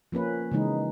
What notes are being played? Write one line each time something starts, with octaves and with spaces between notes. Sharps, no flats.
F3 A#3 C#4 B4
C#3 E3 G#3 D#4